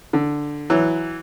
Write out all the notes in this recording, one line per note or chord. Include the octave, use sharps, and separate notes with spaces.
D3
E3 F#3